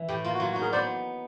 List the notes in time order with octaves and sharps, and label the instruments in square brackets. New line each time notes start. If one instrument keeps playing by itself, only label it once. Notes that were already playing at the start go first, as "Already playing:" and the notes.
Already playing: [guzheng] E3
[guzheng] A2 [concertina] G4
[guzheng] A#3 [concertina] F4
[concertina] F#4
[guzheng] F#3 [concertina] F4
[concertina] F#4
[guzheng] D#4
[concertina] G#4 A#4
[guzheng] B3 [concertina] C5 D5